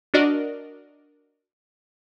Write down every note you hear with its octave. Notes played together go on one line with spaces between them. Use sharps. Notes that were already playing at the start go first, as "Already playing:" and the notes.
D4 F#4 A#4 D5 D#5